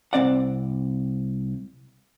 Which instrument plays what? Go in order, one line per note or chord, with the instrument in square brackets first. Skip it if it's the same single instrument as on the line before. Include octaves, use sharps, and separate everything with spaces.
[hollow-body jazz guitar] C2 A#2 C4 D5 F#5